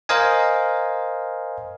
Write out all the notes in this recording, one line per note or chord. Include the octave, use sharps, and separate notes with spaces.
A#4 C5 D#5 F5 G#5